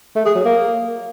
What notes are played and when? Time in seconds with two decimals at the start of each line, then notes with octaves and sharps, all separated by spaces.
0.16 A3
0.25 G#4
0.35 F#3
0.45 A#3